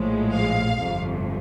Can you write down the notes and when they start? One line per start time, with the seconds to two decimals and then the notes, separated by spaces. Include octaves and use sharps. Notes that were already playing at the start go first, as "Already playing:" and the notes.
Already playing: A#1 A2 F3 G#3
0.34 F5
0.78 G1 F2 C3